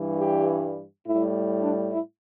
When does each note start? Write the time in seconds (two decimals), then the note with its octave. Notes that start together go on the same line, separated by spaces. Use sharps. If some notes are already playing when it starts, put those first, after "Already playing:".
Already playing: G2 E3 G3
0.19 G4
1.05 A2 G3 E4
1.62 D4
1.91 E4